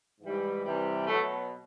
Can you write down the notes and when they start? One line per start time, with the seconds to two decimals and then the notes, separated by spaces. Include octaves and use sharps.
0.21 G#2 E3 G3
0.64 C3 E3 G3
1.07 B2 F#3 A3